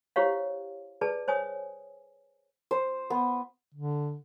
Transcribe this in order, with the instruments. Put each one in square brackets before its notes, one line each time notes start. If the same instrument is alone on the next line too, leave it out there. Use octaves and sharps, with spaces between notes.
[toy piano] E4 G4 C5 C#5 F5
G#4 B4 D5 A5
C5 C#5 G#5 D#6
[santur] C5
B3
[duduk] D3